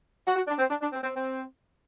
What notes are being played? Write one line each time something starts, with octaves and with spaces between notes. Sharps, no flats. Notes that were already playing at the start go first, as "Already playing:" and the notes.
F#4
F#4
D4
C4
D4
D4
C4
C4
C4